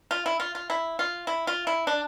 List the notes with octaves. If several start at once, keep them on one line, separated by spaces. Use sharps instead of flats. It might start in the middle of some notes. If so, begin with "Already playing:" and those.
F4
E4
F4
F4
E4
F4
E4
F4
E4
D4